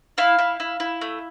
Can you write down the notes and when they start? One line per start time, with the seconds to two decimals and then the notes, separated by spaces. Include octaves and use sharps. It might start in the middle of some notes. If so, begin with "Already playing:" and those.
0.18 E4 F5
0.39 E4
0.60 E4
0.80 E4
1.01 A3